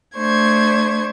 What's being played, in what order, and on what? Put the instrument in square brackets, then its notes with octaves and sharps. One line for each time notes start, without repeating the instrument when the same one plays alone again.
[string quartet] A3 D4 C5 C#6 G#6